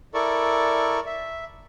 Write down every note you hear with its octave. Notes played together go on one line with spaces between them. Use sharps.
E4 A4 A#4 D5 C#6
E5